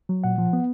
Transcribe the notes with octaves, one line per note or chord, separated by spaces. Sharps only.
F#3
A#2 F#5
F3
B3